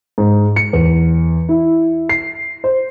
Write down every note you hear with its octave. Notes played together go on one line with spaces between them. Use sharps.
G#2
C#7
E2
E4
C7
C5